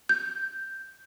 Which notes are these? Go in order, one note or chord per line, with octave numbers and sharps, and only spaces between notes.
G6